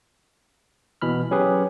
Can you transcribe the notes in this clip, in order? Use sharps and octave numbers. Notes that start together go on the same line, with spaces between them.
B2 E3 B5 F6
F#3 C#4 G4 G#4 B4 C#5